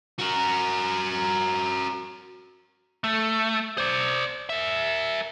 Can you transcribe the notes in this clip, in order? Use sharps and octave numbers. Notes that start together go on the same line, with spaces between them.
F#4 A#4
A3
C5 D5
A#4 E5